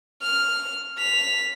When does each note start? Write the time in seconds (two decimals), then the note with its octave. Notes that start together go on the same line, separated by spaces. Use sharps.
0.22 F6
0.98 B6 F7